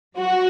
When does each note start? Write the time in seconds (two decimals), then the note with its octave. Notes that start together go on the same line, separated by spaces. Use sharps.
0.19 F#3 F#4